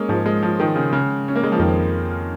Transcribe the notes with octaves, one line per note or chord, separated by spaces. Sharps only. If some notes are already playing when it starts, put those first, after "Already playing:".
Already playing: G#3 A#3 C#4
G#2 F3
G#3
F3
D#3
C#3
C#3
C#4
A#3
G#3
F3
F2 D#3